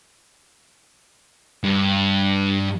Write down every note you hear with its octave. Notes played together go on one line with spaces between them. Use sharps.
G2